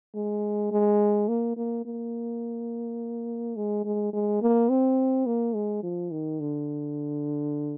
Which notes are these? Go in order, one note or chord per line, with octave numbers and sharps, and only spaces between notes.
G#3
G#3
A#3
A#3
A#3
G#3
G#3
G#3
A#3
C4
A#3
G#3
F3
D#3
D3